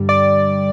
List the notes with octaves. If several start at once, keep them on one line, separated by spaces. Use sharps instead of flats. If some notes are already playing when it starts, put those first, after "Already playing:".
Already playing: G2 D3 G3
D5